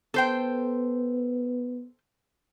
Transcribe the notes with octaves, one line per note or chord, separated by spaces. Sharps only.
B3 A4 C5 G5